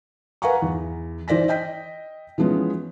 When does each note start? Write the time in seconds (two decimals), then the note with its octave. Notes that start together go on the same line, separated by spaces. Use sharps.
0.42 B4 F5 F#5 G#5 A#5 C#6
0.62 E2
1.28 E3 C5 D5 A#6 B6
1.48 D#5 G5 G6 B6
2.38 E3 F3 G#3 B3 C#4